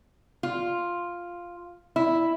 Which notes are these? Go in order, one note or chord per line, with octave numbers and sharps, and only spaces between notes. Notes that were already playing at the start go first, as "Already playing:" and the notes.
F4
E4